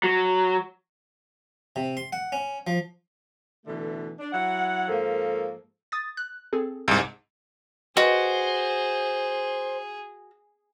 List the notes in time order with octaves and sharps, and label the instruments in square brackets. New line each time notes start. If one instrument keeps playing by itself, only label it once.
[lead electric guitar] F#3
[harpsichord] C3
C6
F#5
C#4
F3
[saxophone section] B2 D3 E3 A3
D4
F#3 E4 F#5
G#2 F3 A#3 A4 A#4
[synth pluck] D#6 A6
F#6
C4 G#4 A4
[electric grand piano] C2 G#2 [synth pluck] E6 E7
[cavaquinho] F#4 [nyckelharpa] G#4 [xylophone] B4 D#5 [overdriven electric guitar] C5